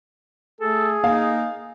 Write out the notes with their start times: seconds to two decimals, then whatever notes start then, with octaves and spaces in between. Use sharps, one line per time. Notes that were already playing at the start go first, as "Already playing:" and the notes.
0.61 A3 G#4 A4
1.04 A#3 D#4 F5 G#5